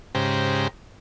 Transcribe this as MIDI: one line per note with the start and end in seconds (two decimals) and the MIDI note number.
0.15 0.68 44
0.15 0.68 49
0.15 0.68 67
0.15 0.68 72
0.15 0.68 82